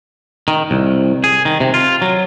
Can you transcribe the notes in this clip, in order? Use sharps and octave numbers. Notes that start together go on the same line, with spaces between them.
D#3
C2
G#4
D#3
C3
F4
F#3